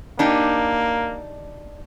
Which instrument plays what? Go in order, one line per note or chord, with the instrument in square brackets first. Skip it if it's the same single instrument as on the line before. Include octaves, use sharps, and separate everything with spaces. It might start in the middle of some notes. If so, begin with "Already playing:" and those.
[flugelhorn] A#3 [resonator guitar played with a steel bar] D4 D#4 G4